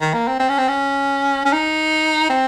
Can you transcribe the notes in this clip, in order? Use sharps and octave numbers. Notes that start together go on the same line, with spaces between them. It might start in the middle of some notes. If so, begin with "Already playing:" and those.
D#3
A#3
C4
C4
C#4
C4
C#4
C#4
D#4
C4